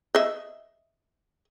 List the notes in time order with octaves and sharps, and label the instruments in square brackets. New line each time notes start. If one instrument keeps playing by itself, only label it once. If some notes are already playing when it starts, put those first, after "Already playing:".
[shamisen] D#5 E5